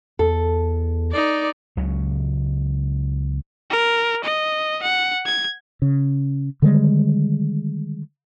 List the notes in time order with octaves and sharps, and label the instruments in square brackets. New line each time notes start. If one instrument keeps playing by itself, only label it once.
[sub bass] E2 [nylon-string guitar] A4
[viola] D#4 D5
[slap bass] C#2 C#3 F#3
[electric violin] A#4
D#5
F#5
G#6
[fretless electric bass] C#3
D3 D#3 G3 G#3